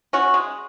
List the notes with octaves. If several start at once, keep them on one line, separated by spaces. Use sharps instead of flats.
C#4 F#4
G#3